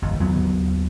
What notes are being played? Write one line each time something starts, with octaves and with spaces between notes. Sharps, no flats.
G1 D#2
D#2 F#3 B3